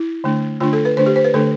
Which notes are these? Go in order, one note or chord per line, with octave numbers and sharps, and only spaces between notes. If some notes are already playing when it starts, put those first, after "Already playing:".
Already playing: E4
D3 A3 D4
D3 A3 D4 F4
A4
B4
D3 A3 D4 C5
G4
C5
B4
D3 A3 D4 A4